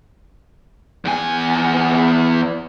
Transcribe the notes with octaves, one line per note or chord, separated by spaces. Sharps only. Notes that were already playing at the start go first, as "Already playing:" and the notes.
E2 G#5